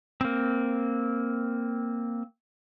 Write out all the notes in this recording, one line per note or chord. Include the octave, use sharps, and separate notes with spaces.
A#3 C4